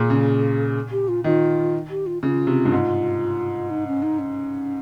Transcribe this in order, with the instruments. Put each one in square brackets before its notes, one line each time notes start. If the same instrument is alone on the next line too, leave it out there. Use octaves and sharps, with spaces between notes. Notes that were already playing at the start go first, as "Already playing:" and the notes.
Already playing: [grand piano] A#2 [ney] G#4
[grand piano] C#3
[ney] G4
F4
[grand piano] D#3 [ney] F4
[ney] G4
F4
[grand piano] C#3 [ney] F4
[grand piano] C3
G2
G#2
[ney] D#4
C#4
D#4
C#4